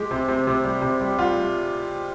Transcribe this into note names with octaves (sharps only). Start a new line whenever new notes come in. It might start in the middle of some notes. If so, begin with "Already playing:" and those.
Already playing: G#3 G4
C3
C3
C3
G3
C3
G3
G3 F4
G3